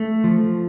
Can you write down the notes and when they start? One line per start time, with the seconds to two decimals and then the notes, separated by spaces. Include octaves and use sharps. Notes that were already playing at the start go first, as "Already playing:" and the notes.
Already playing: A3
0.24 F3